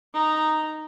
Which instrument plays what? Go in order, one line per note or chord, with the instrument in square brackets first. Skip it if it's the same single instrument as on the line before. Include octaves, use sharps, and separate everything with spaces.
[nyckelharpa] D#4 A#5